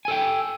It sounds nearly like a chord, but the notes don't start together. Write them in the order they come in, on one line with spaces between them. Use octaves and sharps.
G#5 A4 G5